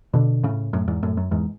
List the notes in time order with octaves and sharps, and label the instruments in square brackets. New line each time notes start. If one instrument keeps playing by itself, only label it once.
[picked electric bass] B2 D3
A2 C#3
F#2 A2
E2 G#2
F#2 A2
F#2
E2 G#2